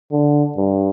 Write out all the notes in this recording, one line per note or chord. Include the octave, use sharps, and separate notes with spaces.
D3
G2